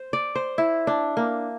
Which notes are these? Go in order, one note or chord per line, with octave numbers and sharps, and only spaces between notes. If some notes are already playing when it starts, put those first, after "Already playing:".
Already playing: C5
D5
C5
E4
D4
A#3